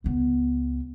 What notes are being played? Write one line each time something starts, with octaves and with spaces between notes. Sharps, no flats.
C#2 B3